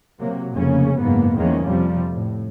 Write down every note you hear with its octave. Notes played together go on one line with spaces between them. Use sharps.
C3 F#3 A#3
F1 C#3 A#3 C#4
F#1 G#2 A#3 B3
E2 D#3 F3 G#3 A#3 C#4
F2 C3 F3 G3
A2